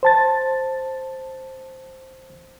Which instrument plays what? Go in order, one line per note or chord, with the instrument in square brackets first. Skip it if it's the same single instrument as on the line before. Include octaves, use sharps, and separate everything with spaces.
[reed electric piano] C5 A5 A6